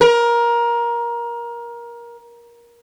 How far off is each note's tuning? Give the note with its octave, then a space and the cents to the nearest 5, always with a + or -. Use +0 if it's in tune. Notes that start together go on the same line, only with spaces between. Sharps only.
A#4 +20